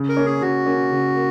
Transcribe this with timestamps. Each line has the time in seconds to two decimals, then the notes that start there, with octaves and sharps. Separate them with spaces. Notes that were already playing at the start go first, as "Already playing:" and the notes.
Already playing: C#3
0.09 A#4
0.17 A#3 C#4
0.25 G#4
0.41 C#3 F#4
0.66 A#3 C#4
0.91 C#3
1.16 A#3